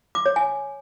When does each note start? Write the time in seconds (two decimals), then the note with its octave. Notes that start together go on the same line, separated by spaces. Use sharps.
0.15 D6
0.26 C#5
0.36 G#5